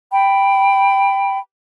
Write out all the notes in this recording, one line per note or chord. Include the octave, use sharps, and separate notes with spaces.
G5 B5